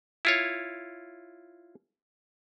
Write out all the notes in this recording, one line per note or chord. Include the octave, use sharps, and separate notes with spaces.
E4 F4 C#5